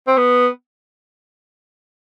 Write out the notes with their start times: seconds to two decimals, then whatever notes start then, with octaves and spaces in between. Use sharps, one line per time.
0.07 C4
0.17 B3